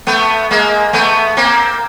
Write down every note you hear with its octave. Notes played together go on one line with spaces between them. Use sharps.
A3 B3
G#3 A#3
A3 B3
A#3 C4